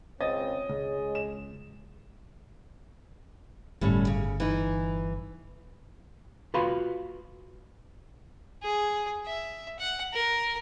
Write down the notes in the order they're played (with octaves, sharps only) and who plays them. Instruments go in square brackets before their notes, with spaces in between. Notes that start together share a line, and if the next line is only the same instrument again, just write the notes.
[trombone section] C#2 C#3 C4 [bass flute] C#5 [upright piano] D#5 A6
[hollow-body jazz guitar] C#2 [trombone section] G#3
[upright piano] E7
[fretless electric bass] G1 [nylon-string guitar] A2 G3 C#4
[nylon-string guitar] C#3
E3 D#4
[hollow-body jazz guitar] F4 F#4 B4 F5 B5 C6
[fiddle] G#4
E5
F#5
A#4